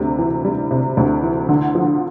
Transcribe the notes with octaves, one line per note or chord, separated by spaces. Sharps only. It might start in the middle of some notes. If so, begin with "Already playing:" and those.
Already playing: D2 C3 G3
E3
G3
C3
D2
E3
D3
F3